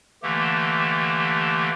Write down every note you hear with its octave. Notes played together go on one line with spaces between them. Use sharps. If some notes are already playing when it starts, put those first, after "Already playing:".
D3 E3 A3 A#3 G4